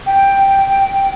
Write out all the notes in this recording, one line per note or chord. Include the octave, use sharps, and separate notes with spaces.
G5